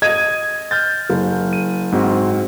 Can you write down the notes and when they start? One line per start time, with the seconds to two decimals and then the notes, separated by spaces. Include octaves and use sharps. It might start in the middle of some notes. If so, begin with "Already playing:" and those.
0.02 D#5 G#6 D#7
0.71 F6 G6 A6
1.10 F#1
1.53 D#7
1.92 G#2 C4 F#4